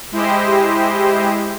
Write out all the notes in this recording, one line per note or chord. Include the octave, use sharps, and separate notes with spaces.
G#3 E4 G4 C5 D#5